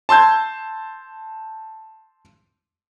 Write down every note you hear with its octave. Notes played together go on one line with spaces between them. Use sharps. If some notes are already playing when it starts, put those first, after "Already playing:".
A5 C6 E6 G6 G#6